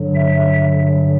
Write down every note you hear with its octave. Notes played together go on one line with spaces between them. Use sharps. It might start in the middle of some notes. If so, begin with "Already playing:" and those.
Already playing: G2 D3 F#3
E5